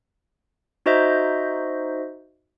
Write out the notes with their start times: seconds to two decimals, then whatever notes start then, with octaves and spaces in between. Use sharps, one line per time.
0.86 D#4 F#4 C5 D#5 E5 G6